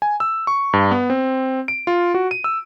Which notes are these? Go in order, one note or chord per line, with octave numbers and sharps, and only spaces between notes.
G#5
E6
C#6
G2
B3
C4
D7
F4
F#4
D#7
E6